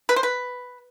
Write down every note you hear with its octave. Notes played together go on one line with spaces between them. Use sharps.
B4
C5
B4